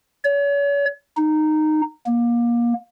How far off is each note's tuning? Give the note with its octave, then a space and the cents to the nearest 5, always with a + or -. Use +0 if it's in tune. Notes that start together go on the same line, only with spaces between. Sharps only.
C#5 +40
D#4 -10
A#3 +25